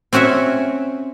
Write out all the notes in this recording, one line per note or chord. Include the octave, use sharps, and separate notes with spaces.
C4 C#4 F#4 C#5 E5